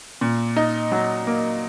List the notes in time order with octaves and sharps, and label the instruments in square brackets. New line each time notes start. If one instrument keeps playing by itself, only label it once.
[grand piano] A#2
D#4
F#3
A#3